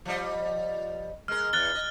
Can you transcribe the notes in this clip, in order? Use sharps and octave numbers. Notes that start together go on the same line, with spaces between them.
F3 G3 D#5
G#3 A#4 F6
E2 E3 F#6 A6 G7
D#5